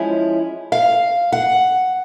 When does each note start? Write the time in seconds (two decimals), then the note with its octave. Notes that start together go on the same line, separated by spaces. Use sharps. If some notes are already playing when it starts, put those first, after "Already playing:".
Already playing: F3 G#3 C#4 E4
0.72 F5
1.32 F#5